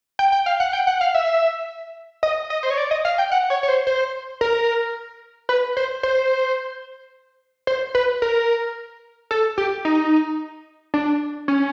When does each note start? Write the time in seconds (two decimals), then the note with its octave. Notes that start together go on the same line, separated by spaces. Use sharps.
0.19 G5
0.32 G5
0.46 F5
0.60 F#5
0.73 G5
0.87 F#5
1.01 F5
1.14 E5
2.23 D#5
2.50 D#5
2.63 C5
2.70 C#5
2.78 D5
2.91 D#5
3.05 F5
3.18 G5
3.31 F#5
3.50 C#5
3.63 C#5
3.68 C5
3.87 C5
4.41 A#4
5.49 B4
5.77 C5
6.03 C5
7.67 C5
7.95 B4
8.22 A#4
9.31 A4
9.58 G4
9.85 D#4
10.94 D4
11.48 C#4